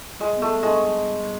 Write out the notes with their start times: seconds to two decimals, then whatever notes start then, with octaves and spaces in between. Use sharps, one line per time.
0.20 G3 G#3
0.36 B3
0.42 A3
0.51 G3
0.63 G#3 D4
0.84 G3
1.00 G3
1.16 G3